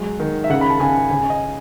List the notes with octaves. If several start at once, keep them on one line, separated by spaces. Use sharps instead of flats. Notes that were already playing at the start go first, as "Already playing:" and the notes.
Already playing: F#3 G#3
D#3
E5
C#3 F#5
B5
A5
C#3 G#5
C#3 G#5
D#5